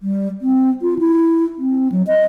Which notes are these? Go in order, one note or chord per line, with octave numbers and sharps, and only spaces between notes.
G3
C4
F4
E4
C4
F#3
D#5